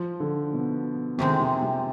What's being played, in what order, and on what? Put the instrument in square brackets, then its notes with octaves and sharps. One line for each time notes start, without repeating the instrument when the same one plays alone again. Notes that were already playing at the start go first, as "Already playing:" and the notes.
Already playing: [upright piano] F3
D3
B2
[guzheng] F2 D#3 G#3 C4 [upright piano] C3
[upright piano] C3
C3